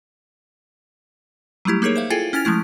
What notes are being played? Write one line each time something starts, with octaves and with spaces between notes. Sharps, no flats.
F#3 G3 A3 E4 G4
A#3 D#4 G#4 A#4 C#5
C5 E5 F5
E4 F4 G#4 A4 G5 G#5
C#4 E4 G#5 F6 A6 F7
F3 G#3 A3 E4